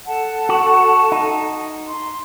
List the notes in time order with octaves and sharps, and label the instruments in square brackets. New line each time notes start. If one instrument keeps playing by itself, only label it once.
[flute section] A4 F#5 A5
[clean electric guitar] F#4
D#4
[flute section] C6